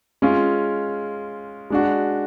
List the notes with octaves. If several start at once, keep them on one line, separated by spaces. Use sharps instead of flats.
G#3 C#4 F4
G#3 D4 F#4